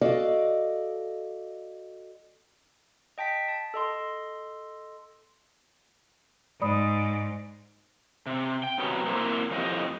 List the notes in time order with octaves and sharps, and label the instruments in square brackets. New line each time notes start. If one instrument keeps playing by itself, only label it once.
[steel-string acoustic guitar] F#4 A4 D5 D#5 F5
[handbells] D#5 G5 A5 B6
A5
A4 D#5 C6
[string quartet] G#2 [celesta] D5 B5 D#6
[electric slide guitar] C3
G5
F#2 C3 F#3 B3 C#4
A#3 C4 E4 B4 C5
F2 A2 F3 G4 D#5